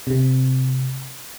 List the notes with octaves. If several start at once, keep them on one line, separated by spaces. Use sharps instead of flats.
C3